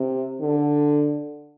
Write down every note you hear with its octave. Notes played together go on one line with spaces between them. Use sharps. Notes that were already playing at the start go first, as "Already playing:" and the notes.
Already playing: C3
D3